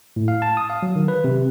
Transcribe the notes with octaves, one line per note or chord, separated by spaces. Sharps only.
A2
F5
A5
D#6
F5
F#3
D#3
B4
C3